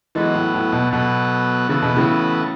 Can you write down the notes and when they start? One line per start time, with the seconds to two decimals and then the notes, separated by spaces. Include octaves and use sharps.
0.15 E3 F#3 G#3 B3 F#4 A4
0.34 A2
0.54 A2
0.73 B2
0.92 B2 F#3 B3 F#4 A4
1.69 C#3 E3 B3 F#4 A4
1.82 B2
1.96 A2 C#3